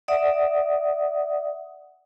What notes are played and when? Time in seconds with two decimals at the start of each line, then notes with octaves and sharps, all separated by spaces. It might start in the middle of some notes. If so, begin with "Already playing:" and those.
0.08 D5 E5 F#5 D#6